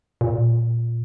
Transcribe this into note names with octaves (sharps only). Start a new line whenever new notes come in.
A#2